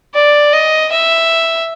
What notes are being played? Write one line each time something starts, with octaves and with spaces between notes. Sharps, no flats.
D5
D#5
E5